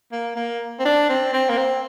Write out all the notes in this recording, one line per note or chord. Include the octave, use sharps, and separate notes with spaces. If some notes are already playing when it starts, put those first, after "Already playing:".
A#3
A#3
C4
D4
C4
C4
A#3
C4